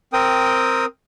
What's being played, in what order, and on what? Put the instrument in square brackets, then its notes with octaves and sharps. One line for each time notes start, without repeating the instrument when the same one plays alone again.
[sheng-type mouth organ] C4 A#4 G5 D#6